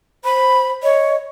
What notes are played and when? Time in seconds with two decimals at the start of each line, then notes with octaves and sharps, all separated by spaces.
0.24 C5 B5
0.83 C#5 D#5